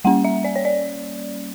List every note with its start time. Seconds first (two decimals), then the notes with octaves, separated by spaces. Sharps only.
0.04 G3 A#3 C#4 F#5
0.25 E5
0.44 D5
0.56 C#5
0.65 D5